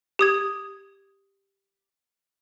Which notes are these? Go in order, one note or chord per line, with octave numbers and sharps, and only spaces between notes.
G4 D#6 G#6